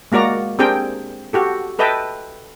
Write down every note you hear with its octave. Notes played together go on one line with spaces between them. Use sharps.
G#3 A#3 F#4 D5 A#5
C4 D4 G4 G#4 A#4 G5
F#4 G4 A4
A4 B4 D#5 E5 G5 A5